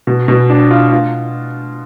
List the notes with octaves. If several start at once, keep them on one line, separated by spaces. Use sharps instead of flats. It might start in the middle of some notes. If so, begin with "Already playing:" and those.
B2
B2
D4
F4
F4